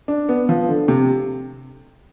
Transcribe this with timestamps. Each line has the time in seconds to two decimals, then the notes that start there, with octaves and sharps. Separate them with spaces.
0.08 D4
0.29 B3
0.49 F3
0.69 D3
0.88 C3